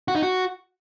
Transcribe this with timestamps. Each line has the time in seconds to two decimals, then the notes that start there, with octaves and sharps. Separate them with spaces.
0.08 F#4
0.15 D#4
0.22 F#4